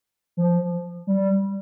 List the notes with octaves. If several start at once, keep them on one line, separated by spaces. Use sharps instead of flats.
F3
G3